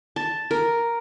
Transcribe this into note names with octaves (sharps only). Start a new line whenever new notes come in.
A5
A#4